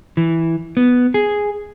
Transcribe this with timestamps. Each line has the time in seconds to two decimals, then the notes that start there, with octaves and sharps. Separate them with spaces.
0.17 E3
0.77 B3
1.14 G#4